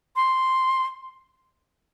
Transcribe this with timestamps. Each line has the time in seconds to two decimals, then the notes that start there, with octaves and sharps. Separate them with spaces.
0.16 C6